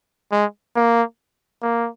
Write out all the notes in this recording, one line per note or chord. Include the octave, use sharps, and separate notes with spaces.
G#3
A#3
A#3